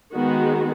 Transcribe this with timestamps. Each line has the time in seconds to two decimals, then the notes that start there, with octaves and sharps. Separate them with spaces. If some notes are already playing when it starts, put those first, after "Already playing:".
0.15 D#3 G#3 B3 F#4